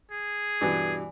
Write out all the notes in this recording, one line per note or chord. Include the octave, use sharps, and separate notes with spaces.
G#4
G2 B2 E3